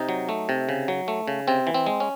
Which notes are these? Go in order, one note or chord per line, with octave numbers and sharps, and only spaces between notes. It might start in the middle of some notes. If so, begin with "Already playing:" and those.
Already playing: C3 D#4
F#3
A3
C3
C#3
F#3
A3
C#3
C3 C4
E3
C4
G#3
C#4